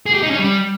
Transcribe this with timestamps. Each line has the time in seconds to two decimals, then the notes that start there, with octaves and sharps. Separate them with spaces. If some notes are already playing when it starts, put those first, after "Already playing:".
0.06 G#4
0.14 G4
0.23 D#4
0.31 C#4
0.39 G3